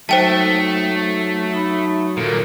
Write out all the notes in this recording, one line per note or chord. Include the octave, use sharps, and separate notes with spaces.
F#3 A3 D#4 C5 E5 G5 A5
D#4 B5
D#2 A#2 A4 A#4